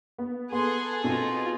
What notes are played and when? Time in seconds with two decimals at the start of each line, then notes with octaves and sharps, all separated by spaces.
0.18 B3
0.52 B3 G#4 A4 F#5 C6
1.04 B2 C4 D#4 F4